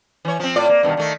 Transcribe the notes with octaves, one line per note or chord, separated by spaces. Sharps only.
E3 C#5
F3 C4
A2 F4 D5
A#3
G2 B2 D#3
D#3 A3